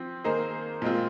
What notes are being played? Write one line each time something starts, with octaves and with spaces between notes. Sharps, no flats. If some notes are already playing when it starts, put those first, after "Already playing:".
Already playing: F3 C4
D#3 A#3 D#4 G#4 C5
A#2 G#3 C4 F4